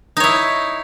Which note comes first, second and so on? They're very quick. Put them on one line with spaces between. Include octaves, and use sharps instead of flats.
D#4 C#5 E4